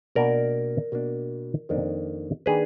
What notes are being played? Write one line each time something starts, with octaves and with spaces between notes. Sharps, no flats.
B2 A#3 D4 A#4 D5
B2 A#3 D4
F2 D#3 A#3 D4
D#3 A#3 D4 G#4 B4